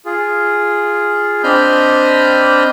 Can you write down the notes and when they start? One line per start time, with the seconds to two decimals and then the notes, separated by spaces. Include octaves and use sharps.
0.05 F4 G#4
1.44 C4 D4 D#5 B5 F6 G6